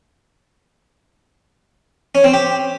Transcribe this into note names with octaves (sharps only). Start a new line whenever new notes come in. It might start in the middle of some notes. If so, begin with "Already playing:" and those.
C#4
C4
G4